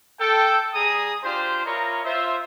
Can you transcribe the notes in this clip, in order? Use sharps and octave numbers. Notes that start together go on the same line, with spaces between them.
A4 G5
G3 G#4 A#5 D#6
D4 F4 G4 C5
E4 F4 A#4 C#5 D#5 A#5
F4 C5 E5